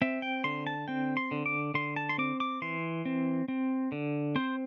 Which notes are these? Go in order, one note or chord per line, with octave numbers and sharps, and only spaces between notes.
C4 E5
G5
D3 C6
A5
C4 G5
C6
D3
D6
D3 C6
A5
C6
C4 D6
D6
E3 C6
C4
C4
D3
C4 C5